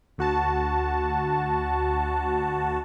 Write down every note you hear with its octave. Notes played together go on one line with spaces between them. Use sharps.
D2 F#4 A5